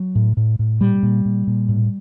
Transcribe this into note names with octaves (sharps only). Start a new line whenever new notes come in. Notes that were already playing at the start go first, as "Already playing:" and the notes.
Already playing: F#3
A2
A2
A2
A#2 G3
A#2
A#2
A#2
A2